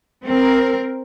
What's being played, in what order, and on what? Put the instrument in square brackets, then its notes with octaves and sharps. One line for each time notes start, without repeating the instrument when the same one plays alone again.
[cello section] C4 A#4